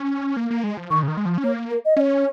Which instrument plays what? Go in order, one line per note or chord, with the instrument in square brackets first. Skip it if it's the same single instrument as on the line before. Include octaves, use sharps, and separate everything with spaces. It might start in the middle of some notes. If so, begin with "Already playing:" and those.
Already playing: [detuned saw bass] C#4
A#3
A#3
G#3
F3
[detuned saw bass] D#3 [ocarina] C#6
[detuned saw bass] C#3
D#3
G#3
F3
C#4
[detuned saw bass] A#3 [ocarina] C#5
[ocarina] A#4
D#5
[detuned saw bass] C#4 [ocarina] C#5 D#5